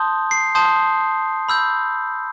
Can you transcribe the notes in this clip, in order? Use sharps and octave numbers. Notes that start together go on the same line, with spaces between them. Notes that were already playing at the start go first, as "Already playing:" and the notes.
Already playing: A5 C6 D#6 G6
C7
A5 C6 D#6 G6
B5 E6 G6